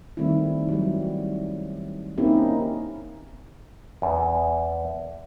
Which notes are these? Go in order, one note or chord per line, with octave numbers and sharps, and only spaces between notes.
D#3 G3 A3 C4 E4
F#3 G3
A#3 C4 C#4 D#4 E4 G4
E2